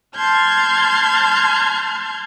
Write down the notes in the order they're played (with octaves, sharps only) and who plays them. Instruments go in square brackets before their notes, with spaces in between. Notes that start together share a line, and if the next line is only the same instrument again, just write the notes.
[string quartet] A5 C6 F6 G6 G#6